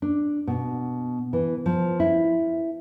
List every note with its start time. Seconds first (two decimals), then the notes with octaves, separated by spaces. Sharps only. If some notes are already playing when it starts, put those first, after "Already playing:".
0.02 D4
0.47 B2
1.33 E3
1.66 F3
2.00 E4